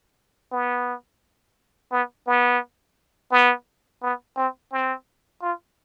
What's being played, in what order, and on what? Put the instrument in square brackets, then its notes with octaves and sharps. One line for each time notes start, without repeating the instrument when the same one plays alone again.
[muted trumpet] B3
B3
B3
B3
B3
C4
C4
F4